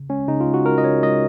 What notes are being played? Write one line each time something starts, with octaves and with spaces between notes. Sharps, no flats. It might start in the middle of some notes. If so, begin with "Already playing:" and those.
Already playing: C#3
G#3 C#4
C#3 D#4
F4
G#3
F#4
G#3 A#4
D#5
C#3 C#5
G#3 D#5